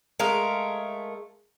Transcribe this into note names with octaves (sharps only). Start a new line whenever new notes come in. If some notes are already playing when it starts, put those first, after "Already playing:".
G#3 A3 A#4 F5